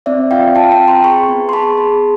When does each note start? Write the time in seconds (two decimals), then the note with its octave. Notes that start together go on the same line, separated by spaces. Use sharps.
0.06 C4 D5 E5
0.31 F4 F5 G5
0.55 F4 G5 A5
0.72 G5 A5
0.80 C4
0.88 A#5 C6
1.04 G#4 B5 C#6
1.28 B3
1.49 C6
1.53 G#4 A5 B5
1.78 G#4